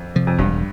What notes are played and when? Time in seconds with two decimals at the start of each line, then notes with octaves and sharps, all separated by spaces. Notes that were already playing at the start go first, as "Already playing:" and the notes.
Already playing: F2
0.16 C3 F3
0.27 F2
0.38 E1 G2